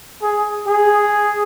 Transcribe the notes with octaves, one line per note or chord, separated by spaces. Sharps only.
G#4
G#4